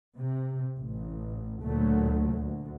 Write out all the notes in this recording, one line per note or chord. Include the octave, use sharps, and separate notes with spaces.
C3
A1
D2 A#2 F#3 A3
D2